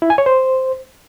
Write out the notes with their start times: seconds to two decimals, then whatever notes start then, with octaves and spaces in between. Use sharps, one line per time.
0.02 E4
0.10 G#5
0.18 C#5
0.26 C5